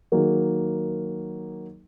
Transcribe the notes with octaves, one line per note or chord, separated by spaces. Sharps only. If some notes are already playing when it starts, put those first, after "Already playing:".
D#3 F#3 A#3 D#4 G#4